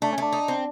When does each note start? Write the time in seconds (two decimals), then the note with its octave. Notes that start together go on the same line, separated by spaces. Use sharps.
0.02 A3 D4
0.13 C#4
0.18 A3 D4
0.33 D#4
0.48 C4